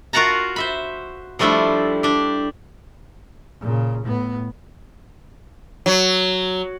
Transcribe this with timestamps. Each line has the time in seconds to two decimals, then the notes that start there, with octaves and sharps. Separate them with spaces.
0.13 F4 F#4 A#4 F#5 A5 A#5
0.56 C5 E5 B5
1.39 F3 G3 A3 D4 E4
2.03 D4 G4
3.61 A#2 C#3
4.05 A2 B3
5.86 F#3